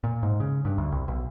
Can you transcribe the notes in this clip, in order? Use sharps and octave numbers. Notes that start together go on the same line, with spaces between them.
A#2
G#2
C#3
G2
D2
C2
B1